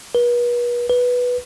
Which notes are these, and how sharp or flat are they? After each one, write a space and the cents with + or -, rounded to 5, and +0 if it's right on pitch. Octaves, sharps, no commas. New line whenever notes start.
B4 -40
B4 -5